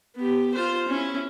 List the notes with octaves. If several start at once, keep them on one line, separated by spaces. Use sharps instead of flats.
B3 G4
F4 C5
C#4 E4